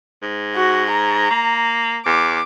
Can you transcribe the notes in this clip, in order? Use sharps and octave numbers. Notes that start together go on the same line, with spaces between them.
G#2
F#4
A#5
A#3
E2 D6